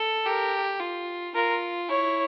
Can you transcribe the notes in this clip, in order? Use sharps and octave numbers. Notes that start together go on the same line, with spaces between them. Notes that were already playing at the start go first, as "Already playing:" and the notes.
Already playing: A4
G4 A#4
F4
F4 A#4
E4 C#5